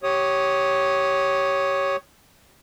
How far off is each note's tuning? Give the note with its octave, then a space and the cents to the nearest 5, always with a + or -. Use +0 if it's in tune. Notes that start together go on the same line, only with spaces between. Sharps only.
G4 -15 C#5 +0 D#6 +0